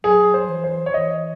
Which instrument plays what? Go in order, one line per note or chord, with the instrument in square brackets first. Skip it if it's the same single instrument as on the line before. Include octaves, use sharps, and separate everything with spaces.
[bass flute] F#3 [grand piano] G#4
[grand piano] C5
[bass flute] E3
[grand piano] C5
C#5
[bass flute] E3 [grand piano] D#5